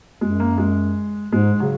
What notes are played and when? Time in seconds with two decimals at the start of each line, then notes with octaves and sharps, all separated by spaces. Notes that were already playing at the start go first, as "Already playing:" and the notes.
0.21 F#2 G#3
0.40 A#3
0.58 G#3
1.32 G#2 G#3
1.60 C#3 F#3